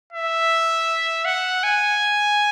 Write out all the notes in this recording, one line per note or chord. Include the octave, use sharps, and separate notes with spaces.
E5
F#5
G#5